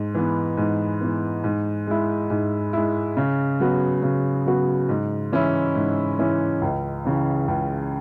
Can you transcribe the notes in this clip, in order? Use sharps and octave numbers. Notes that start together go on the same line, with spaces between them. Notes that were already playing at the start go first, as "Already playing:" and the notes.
Already playing: G#2
E3 B3
G#2
E3 B3
G#2
G#3 E4
G#2
G#3 E4
C#3
F#3 B3 F#4
C#3
F#3 B3 F#4
G#2
E3 C#4 E4
G#2
E3 C#4 E4
C#2
C#3 E3
C#2